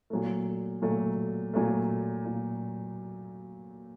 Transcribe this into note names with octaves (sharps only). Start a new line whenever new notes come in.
A#2 F#3 A3
A#2 F#3 A3
A#2 F#3 A3
A#2